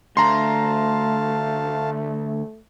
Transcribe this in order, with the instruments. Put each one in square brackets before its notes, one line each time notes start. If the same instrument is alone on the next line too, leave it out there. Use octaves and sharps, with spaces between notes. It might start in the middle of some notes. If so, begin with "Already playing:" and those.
[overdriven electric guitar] D2 [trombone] A3 [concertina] F5 A5 [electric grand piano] A#5 C6